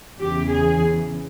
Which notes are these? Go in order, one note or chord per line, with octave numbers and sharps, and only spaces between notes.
E2 C#3 E3 G4
G#4